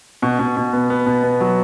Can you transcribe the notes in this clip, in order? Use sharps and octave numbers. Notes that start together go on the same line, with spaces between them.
B2
B2
B2
B3
B3
B2
B3
F#3